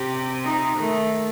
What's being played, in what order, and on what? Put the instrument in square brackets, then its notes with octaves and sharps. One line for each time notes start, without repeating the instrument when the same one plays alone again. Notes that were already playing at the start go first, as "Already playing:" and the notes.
Already playing: [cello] C3 [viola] G4
[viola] D#4
[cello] D#3 [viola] A3